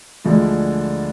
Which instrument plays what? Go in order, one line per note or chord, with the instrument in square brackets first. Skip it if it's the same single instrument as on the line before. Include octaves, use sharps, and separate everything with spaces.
[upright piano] D2 D3 F3 G#3